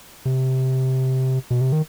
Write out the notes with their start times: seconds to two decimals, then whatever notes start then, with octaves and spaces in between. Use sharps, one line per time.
0.25 C3
1.51 B2
1.61 C3
1.72 D#3